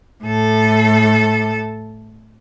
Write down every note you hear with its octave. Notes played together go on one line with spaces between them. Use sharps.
A2 A4